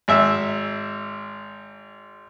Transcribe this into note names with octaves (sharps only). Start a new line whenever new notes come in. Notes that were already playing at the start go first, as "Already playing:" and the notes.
G#1 E5